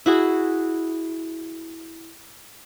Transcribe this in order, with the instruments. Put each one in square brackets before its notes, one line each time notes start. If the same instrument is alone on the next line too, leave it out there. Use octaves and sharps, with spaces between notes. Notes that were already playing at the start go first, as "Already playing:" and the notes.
[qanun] E4 F#4 G#4